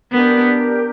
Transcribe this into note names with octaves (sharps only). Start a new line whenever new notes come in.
B3 D4 G4 A#4